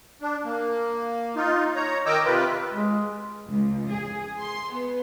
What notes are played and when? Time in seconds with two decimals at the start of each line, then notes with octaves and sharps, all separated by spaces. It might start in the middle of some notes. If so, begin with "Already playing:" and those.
0.22 D4
0.45 A#3
1.36 D#4 F4
1.76 C#5 A#5
2.06 D#3 A#4 D#5 G5 D6 E6
2.25 C3 F4 B4
2.73 G#3
3.47 C#2
3.90 G#4
4.41 C6
4.71 B3